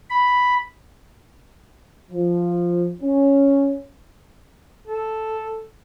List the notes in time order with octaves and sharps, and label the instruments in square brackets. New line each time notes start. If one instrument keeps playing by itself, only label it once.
[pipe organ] B5
[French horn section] F3
C#4
[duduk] A4